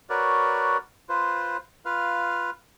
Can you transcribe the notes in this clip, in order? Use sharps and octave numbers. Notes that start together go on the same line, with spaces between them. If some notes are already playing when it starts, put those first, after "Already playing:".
F#4 A#4 B4 C#5 D5
F4 B4 C5
F4 B4 F5